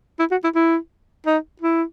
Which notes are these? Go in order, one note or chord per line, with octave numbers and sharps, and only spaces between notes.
E4
F#4
E4
E4
D#4
E4